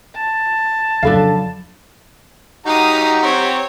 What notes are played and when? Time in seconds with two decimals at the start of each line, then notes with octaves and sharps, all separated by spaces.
0.15 A5
1.03 F2 C#3 F#3 D4 A4 F5 B5
2.66 D#4 F#4 G4 F5 F#5 A#5 D#6
3.23 C4 C#5